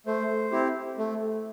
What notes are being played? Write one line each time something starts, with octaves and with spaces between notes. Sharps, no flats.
A3 C5
C4 E4 G4
A3